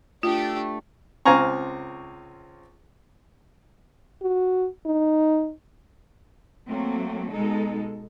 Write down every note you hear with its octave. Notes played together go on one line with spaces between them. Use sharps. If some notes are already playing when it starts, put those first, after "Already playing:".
A3 D4 F4 G4
C#2 C4 F5 G#5 A#5 C#6
F#4
D#4
F#3 A3 A#3 C4
B2 G#3 D#4 A4